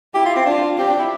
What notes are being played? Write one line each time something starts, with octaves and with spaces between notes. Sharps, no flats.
E4 G4
F4
C4
D4 F4
C4 G4
D4
E4